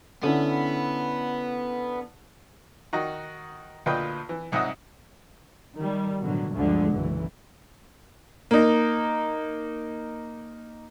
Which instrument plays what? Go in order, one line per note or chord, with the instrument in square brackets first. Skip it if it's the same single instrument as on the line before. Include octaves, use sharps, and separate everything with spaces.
[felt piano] D3 C#4 E4 [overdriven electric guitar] B3
[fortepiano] D#3 D#4 F#4
D2 A#2 F4 B4 D#5 G5
E3
C2 G#2 D#4 E5 F#5 D#6
[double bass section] D#3 G3
A1 B2 D3 F#3
G1 D2 D3 F3 G#3
F#1 B1 E3
[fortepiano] A#3 D#4